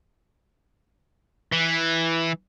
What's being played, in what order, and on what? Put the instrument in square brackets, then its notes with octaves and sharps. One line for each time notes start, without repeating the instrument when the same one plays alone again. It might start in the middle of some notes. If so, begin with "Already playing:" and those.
[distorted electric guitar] E3